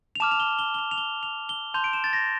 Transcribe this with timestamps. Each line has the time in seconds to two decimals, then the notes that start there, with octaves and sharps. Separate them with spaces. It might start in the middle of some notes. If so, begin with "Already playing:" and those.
0.15 F7
0.20 A5 D6 F6 E7
0.31 F7
0.40 G7
0.59 G7
0.74 G7
0.79 F7
0.91 F7
0.98 G7
1.23 F7
1.49 G7
1.74 A5 C6 G6 F7
1.84 D7
1.93 E7
2.04 A6
2.13 A#6